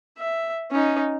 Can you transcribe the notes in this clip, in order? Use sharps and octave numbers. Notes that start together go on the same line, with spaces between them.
E5
C#4 D#4